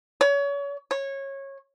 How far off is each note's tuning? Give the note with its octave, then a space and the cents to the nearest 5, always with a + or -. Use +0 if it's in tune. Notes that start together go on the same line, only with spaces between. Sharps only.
C#5 +30
C#5 -20